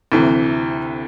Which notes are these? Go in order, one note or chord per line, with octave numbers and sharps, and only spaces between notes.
D2 C3 E3